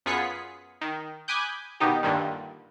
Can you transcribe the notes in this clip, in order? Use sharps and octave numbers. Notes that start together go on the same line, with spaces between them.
F#2 B3 F4 G#4 B6 C#7
D#3
G#5 B5 D6 D#6 F#6 G6
B2 D#3 D#4 G4
G2 A#2 D3 D#3 G3